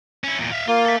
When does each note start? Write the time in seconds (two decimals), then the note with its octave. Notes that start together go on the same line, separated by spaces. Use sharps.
0.24 C#4 E4
0.38 E2 A#2
0.52 E5 F5
0.68 A#3 F4
0.85 A4 E5